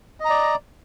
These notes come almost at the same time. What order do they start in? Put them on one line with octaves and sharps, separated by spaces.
D#5 A#5 D5